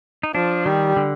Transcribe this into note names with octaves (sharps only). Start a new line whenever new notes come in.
D#4
F3 D4
D#3 G3
D3